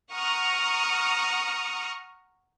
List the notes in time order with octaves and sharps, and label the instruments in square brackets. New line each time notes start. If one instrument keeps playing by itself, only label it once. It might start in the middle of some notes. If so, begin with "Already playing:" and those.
[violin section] F#5 A#5 C#6 D#6 F6